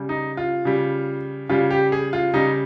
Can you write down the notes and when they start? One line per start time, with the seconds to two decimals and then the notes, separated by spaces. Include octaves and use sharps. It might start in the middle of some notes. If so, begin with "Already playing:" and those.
Already playing: C#3 G3
0.09 D#4
0.37 F4
0.65 C#3 G3
1.49 C#3 G3 F4
1.71 G4
1.92 G#4
2.13 F4
2.33 C#3 G3 D#4